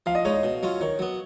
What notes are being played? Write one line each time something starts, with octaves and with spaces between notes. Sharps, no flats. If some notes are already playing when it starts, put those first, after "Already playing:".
F3 F5
D#5
G#3 D#4 C#5
D#5
B2
F#3 C#4 F4
D#3 C#5
F#3 B3